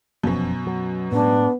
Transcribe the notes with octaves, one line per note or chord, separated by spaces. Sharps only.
F1 F#2 B2 F3 C#4
F#3
A2 G#3 B3 D4